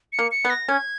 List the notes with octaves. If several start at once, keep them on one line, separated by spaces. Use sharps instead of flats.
C#7
A#3
C#7
B3
A#6
C#4 G#6